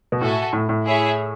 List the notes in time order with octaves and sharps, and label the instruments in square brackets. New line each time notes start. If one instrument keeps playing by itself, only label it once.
[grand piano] B2
[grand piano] A2 [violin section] F#4 A4 E5 G#5
[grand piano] A2
A2
[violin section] E4 G#4 C#5 E5